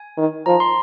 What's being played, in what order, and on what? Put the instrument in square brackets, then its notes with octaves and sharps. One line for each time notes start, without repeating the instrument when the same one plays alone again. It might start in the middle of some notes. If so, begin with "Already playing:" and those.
Already playing: [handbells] G#5
[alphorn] D#3
[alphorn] F3 [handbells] A#5
[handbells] C6